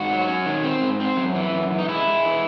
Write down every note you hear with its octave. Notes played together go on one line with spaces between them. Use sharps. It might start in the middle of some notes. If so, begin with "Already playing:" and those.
Already playing: G#2 F#4
F#3
C#4
D#3
C4
G#2
C4
F#2
E3
F#2
E3
D#4
G#3 E4
G#3
E3